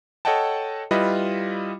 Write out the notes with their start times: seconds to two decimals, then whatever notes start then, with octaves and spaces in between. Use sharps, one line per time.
0.25 A4 C#5 D#5 F#5 G5 A5
0.91 G3 E4 F4 B4 D#5